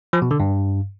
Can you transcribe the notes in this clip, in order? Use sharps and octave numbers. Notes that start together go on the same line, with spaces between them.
F3
B2
D3
G2